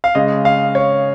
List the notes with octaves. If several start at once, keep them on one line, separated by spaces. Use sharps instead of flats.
F5
C#3 G#3 D#5
F5
C#5